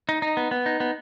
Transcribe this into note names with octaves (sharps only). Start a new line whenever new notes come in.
D#4
D#4
B3
B3
D#4
B3